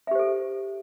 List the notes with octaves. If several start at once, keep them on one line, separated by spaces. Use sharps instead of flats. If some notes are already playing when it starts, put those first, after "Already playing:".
G4 A4 C5 E5